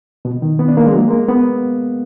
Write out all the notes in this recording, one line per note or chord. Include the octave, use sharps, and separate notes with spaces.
B2
D#3
B3
D4
A#3
G#3
F#3
G#3
A#3
B3